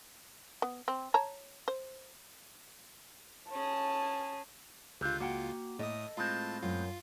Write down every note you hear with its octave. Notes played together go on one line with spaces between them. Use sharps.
B3
C4
C#5 A5 A#5
C5
C#4 G#4 A5
C#2 D3 F4 G4
A#3 F#4 F#5 G5
A2 A4 D#5 D#6
A2 G#3 C4 F4 A5
F#2 F4